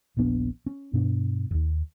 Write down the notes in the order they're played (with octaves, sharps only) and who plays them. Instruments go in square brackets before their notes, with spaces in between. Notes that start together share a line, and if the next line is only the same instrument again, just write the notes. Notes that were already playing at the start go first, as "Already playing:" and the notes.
[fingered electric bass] D#1 A#1 B3 D4
C#4
G2 B2 D4
D1 D#2